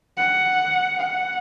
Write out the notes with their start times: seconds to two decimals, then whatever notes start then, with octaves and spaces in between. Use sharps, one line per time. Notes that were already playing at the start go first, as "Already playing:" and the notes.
0.18 F#5
0.99 F#5